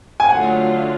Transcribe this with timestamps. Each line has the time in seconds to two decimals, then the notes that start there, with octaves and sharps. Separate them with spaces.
0.20 G#5
0.29 D3 F#3 A3 F4 F#5